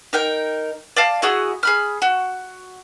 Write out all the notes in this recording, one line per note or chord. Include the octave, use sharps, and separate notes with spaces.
D#4 A#4 G5
D5 F5 A5
E4 F#4 G#4 D#6
G#4 B5 F6
F#4